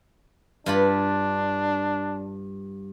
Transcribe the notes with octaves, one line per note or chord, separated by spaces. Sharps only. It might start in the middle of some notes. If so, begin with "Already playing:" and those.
G2 D4 F4 B5